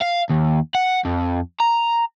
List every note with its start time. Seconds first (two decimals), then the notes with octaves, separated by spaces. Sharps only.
0.01 F5
0.30 D#2
0.75 F#5
1.05 F2
1.60 A#5